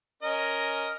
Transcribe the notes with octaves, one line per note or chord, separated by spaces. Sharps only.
C#4 A#4 D#5